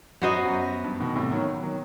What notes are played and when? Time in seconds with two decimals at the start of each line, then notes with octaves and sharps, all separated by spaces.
0.22 F#2 B3 F#4 C5 D#5
0.45 F#2
0.84 G2
1.00 B2 D#3
1.16 A2 C3
1.31 D#3 F#3
1.63 D#3 F#3